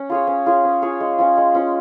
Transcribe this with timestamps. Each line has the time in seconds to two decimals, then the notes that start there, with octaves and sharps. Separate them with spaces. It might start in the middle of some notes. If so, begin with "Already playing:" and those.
Already playing: C#4
0.10 F4 G#4 C#5
0.27 C#4
0.46 F4 G#4 C#5
0.65 C#4
0.82 F4 G#4 C#5
1.00 G#3
1.19 C#4 F4
1.37 G#3
1.55 C#4 F4